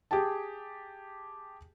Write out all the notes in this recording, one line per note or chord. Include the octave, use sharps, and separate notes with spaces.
G4 G#4 G5 A5